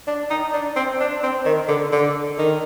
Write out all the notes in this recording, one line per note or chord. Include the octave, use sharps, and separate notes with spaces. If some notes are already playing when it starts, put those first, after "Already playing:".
D4
D#4
D4
C4
D4
C4
D#3
D3
D3
D#3